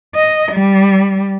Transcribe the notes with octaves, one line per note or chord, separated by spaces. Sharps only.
D#5
G3